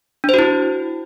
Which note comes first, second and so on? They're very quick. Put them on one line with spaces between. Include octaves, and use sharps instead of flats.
D4 C5 F#4 E4